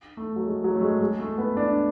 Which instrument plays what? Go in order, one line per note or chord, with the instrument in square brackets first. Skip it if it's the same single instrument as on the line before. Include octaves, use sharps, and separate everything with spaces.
[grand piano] A3
F#3
G#3
F#3
A3
G#3
G#3
A3
B3
D4